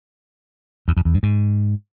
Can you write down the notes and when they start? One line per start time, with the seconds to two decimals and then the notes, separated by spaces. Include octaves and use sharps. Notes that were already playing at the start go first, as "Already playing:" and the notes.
0.88 E2
0.97 F2
1.05 E2
1.14 G2
1.23 G#2